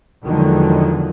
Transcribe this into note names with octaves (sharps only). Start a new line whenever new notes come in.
E2 D3 D#3 F3 F#3 G#3